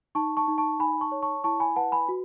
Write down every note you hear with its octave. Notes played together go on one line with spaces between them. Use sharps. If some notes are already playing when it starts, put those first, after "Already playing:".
D#4 A5 C#6
A5 C#6
D#4
A5 C#6
D#4 G#5 B5
A5 C#6
C#5
A5 C#6
E4 A5 C#6
G#5 B5
B4 F#5 A5
G#5 B5
F#4